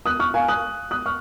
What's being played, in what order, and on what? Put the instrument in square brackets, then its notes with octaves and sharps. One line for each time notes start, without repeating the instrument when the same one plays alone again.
[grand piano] D#6 F#6
C#6 F6
F5 G#5
D#6 F#6
D#6 F#6
C#6 F6